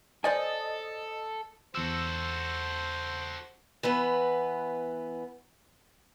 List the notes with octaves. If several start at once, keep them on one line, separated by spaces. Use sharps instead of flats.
A4 C5 D5 D#5 G#5
E2 F#4 A4 C5 E6
E3 B3 B4